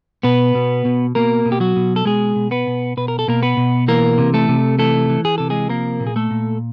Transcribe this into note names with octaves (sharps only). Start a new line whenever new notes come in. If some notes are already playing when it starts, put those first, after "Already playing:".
B2 B3 B4
B2
B2
B2 A#3 A#4
B2
G4
F#3 F#4
B2
A4
B2 G#3 G#4
B2
B3 B4
B2
B2 B4
A#4
A4
B2 A#3 A#4
B3 B4
B2
E3 A#3 A#4
C3
A3 A4
C3
E3 A3 A4
E3
G#4
C3 A4
G#3 G#4
F3 A#3 A#4
A#2
G#4
A3 A4
A#2